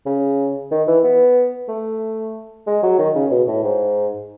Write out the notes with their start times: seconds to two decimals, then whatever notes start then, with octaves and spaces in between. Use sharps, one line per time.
0.06 C#3
0.71 D#3
0.87 E3
1.04 B3
1.68 A3
2.67 G#3
2.83 F#3
2.99 D#3
3.15 C#3
3.31 B2
3.47 A2
3.63 G#2